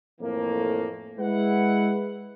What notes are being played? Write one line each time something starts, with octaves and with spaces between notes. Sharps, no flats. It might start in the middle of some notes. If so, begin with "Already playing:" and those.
F2 A2 E3 A3 A#3
G#3 E4 B4 F#5